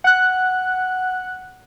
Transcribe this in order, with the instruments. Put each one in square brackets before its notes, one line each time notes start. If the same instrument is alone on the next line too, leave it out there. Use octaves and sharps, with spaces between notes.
[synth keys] F#5 F#6